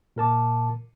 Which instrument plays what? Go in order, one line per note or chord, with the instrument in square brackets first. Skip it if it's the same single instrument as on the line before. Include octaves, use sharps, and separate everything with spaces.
[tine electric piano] A#2 A#4 A5 D6